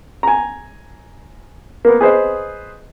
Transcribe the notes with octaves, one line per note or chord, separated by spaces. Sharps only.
G#5 A#5
A#3 B3
G#4 B4 C5 D#5